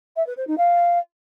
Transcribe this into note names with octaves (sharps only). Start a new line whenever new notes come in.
E5
B4
C5
D#4
F5